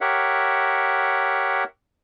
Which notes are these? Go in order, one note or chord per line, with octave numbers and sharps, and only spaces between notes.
G4 A#4 C#5 E5 F#5